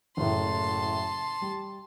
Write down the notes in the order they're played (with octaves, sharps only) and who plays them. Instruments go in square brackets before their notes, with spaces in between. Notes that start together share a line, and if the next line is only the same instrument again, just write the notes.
[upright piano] F#1 A2 [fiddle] A5 C6
[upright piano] G3